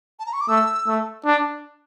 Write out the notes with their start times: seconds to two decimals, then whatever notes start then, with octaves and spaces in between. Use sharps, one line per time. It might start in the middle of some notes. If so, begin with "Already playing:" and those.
0.19 A5
0.26 A#5
0.33 C#6
0.41 D6
0.49 A3 E6
0.87 A3
1.25 D4